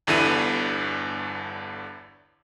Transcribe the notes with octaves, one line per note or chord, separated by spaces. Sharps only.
G1 E2 G2 D3 E4 D#7